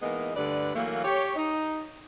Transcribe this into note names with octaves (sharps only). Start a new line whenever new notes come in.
E3 G#3 A#3 B3 D#4
D2 G2 D3 B4 D5
E3 F#3 A3 A#3
G4 C#5
D#4